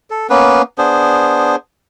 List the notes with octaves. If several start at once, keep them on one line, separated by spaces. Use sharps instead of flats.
A4
A#3 B3 C#4 B4
B3 D4 G#4 C5